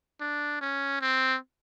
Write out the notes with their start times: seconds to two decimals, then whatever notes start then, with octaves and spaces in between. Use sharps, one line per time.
0.20 D4
0.61 C#4
1.01 C4